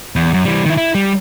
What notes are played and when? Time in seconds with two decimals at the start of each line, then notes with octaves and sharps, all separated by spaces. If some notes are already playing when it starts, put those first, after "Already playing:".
0.16 E2
0.34 F#2
0.46 E3 G3
0.66 D#3 E4
0.78 E4
0.95 G3